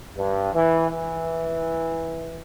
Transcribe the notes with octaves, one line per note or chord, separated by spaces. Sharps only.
G2
E3
E3